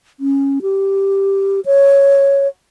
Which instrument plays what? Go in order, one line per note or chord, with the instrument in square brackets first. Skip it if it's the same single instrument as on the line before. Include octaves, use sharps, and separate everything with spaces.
[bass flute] C#4
G4
C#5